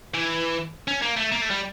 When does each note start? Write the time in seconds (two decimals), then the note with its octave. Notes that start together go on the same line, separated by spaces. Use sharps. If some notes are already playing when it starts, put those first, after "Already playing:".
0.14 E3
0.88 C#4
1.02 A#3
1.17 A3
1.32 A#3
1.42 A3
1.50 G3